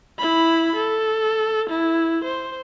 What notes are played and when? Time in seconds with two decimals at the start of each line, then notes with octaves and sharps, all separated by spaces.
0.18 E4 B5
0.76 A4
1.70 E4
2.24 C5